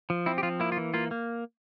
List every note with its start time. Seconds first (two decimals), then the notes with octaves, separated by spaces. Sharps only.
0.10 F3
0.26 C4 E4
0.38 G4
0.43 F3 F4
0.60 A#3 E4
0.72 F4
0.77 E3
0.94 A#3 F4
1.11 A#3